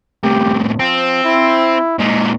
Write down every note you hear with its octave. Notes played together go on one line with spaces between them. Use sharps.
A2 C3 G4
F3 C4
E4
A#2 G#3 D#4